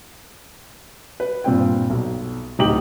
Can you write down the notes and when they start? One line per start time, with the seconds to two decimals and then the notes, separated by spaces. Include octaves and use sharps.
1.20 B4
1.44 G2 A#2 C4 G5
1.90 B1
2.59 D1 D#4 G4 G5 F#7